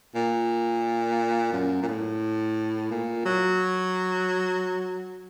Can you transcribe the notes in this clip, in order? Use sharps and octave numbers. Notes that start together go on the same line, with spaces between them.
A#2
F#2
A#2
A2
A#2
F#3